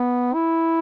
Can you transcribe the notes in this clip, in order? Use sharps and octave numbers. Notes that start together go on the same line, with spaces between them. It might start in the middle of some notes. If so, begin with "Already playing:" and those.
Already playing: B3
E4